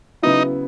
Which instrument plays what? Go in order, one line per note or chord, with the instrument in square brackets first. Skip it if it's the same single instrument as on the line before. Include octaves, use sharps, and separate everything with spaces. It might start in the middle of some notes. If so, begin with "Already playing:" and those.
[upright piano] C#3 F#3 B3 E4 [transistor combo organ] D#4